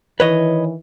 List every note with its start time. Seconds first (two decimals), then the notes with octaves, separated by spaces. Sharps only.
0.20 D#3 E3 B4 C#5 D#5